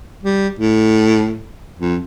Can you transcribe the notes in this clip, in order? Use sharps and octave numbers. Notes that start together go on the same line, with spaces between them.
G3
A2
F2